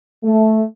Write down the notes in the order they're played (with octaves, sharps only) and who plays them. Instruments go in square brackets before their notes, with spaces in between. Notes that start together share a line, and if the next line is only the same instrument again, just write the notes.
[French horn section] A3